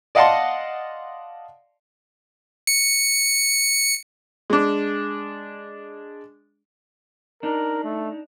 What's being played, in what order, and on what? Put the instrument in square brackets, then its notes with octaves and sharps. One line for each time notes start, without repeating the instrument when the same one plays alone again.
[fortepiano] D5 D#5 F5 F#5 A5 C6
[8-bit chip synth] C#7
[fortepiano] G#3 D4
[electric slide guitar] D4 D#4 [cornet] A#4
[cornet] A3